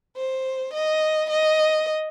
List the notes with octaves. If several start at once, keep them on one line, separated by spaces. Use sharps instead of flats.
C5
D#5
D#5